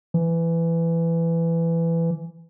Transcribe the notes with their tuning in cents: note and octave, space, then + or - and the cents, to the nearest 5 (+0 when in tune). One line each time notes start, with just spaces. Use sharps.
E3 +15